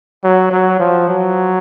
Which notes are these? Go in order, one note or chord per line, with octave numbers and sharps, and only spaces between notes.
F#3
F#3
F3
F#3